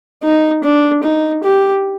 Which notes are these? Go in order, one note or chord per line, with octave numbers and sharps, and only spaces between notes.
D#4
D4
D#4
G4